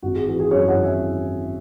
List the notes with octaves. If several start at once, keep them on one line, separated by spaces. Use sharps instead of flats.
G#1 F#4
G#4
E3 F#4
G#4
F#2 G#4 C#5
C#5 F#5
G#1
E5 G#5